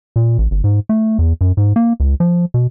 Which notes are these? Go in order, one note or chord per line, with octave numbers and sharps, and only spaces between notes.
A#2
A1
G1
G#2
A3
E2
F#2
G#2
A#3
C#2
F3
B2